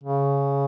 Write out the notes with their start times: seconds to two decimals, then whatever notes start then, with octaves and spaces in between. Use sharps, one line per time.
0.04 C#3